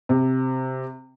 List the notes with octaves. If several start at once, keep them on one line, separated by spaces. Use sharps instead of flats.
C3